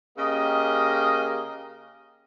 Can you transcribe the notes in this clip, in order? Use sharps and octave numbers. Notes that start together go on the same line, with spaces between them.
C#3 A#3 G4 D#5